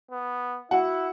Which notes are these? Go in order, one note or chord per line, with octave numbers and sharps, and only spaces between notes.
B3
E4 F#4 F#5